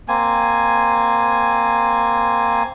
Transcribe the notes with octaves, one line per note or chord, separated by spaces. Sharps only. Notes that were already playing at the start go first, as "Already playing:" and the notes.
A#3 C4 G#5